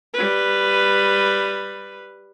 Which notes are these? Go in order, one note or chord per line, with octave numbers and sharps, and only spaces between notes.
G3 B4